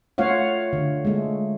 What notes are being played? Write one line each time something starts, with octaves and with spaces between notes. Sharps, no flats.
A3 F4 C#5 F5 F#5
D3
G#3 A3